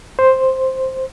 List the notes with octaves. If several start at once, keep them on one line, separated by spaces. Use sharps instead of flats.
C5